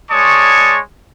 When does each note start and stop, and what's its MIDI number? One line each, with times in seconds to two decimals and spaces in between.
0.11 0.77 56
0.11 0.77 73
0.11 0.77 74
0.11 0.77 81
0.11 0.77 85
0.11 0.77 87